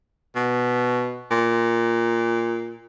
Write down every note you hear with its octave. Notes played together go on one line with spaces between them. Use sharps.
B2
A#2